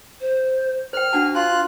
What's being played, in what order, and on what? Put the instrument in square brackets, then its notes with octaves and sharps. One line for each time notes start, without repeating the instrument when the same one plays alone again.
[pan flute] C5
[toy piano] C5 G5 [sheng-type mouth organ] F6
[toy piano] D4 F#5 A5 [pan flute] F#4
[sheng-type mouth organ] F4 F#6 [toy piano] A5 C6